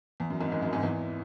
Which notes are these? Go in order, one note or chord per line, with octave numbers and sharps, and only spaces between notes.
E2
F#2
G#1 G#2
G#1 G#2
F#2
G#1 G#2
E2 E3